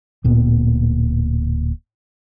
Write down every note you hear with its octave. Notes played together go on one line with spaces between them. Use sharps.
D1 A#2 B3